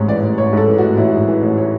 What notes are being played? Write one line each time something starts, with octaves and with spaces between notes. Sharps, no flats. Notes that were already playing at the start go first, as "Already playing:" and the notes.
Already playing: A1 G#2 C#5
E3 D5
A1
A1 C#5
G#2 A4
E3
A1 F#4
A1 E4
G#2
E3
A1
C#5